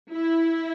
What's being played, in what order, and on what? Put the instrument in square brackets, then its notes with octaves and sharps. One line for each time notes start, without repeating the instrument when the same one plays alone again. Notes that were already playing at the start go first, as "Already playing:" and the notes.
[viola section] E4